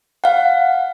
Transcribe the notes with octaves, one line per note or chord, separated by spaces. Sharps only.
F5 F#5